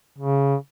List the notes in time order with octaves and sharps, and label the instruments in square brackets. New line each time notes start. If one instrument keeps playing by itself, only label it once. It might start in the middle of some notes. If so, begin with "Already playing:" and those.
[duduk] C#3